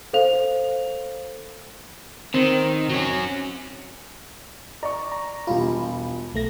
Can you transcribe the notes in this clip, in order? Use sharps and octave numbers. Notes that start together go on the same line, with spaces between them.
A4 C5 F5 F7
D#3 C4
F#3 C#4
D5 A#5 C#6
A#5
E1 G3 F4 B5
B1 A3 A#6